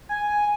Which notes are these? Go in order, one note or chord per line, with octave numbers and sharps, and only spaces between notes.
G#5